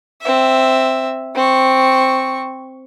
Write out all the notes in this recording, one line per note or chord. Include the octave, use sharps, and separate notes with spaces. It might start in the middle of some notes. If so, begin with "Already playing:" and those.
C4 E5
C4 C#6